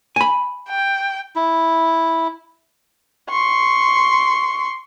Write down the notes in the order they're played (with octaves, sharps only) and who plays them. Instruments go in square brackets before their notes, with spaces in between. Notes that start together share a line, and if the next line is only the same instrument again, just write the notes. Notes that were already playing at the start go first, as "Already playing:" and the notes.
[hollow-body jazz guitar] G#5 B5
[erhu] G5
[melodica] E4
[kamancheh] C6 C#6